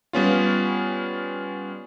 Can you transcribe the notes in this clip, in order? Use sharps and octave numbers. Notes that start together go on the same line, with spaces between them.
G3 B3 C#4 F4